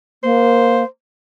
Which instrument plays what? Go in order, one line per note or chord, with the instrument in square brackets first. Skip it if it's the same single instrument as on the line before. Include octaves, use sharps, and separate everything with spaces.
[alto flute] A#3 [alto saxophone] C5